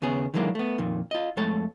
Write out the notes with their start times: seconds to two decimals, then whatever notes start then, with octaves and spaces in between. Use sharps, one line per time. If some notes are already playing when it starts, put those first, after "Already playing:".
0.02 D#2 C#3 B3 G#4
0.34 D#3 E3 F#3 G#3 A#3 D4
0.55 A3 B3
0.78 F2 A#2 D#3
1.11 F4 D#5
1.37 F2 G#3 A3 A4 C#5 A5